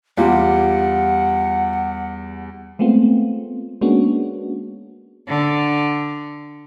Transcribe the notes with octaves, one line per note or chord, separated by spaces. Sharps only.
E2 G3 F4 F#5
G#3 A3 B3 C4 F4
G#3 A#3 B3 C#4 D4 F#4
D3